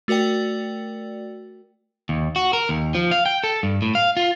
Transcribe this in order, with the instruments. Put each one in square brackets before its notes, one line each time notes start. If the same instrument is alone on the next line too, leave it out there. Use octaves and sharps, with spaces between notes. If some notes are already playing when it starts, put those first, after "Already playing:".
[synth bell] A3 F#4 A#4 D5 G5
[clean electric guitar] D#2
F#4
A#4
D#2
F3
F5
G5
A4
G2
A2
F5
F4